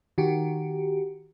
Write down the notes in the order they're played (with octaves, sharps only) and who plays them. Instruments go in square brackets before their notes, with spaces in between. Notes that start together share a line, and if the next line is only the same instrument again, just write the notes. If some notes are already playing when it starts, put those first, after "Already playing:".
[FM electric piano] D#3 F#4 G4